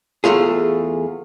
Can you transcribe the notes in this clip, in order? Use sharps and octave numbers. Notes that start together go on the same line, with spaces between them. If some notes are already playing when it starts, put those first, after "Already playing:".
E2 A#2 A3 F4 G#4